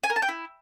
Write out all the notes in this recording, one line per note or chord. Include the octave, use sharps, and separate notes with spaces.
G#5
A#4
A5
G5
E4